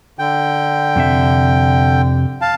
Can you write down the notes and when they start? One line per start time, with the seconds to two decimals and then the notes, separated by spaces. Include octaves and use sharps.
0.19 D3 G5
0.96 F2 C3 E5
2.41 F5 A5